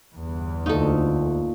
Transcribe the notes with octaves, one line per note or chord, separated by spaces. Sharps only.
G1 E2
D2 A#2 D#4 A4 C#6